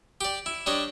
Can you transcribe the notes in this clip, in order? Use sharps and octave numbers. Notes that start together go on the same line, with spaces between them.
G4 D5
E4
G3 D4 C#5 D#5